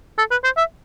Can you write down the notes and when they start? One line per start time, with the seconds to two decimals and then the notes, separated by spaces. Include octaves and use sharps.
0.18 A4
0.31 B4
0.44 C5
0.57 E5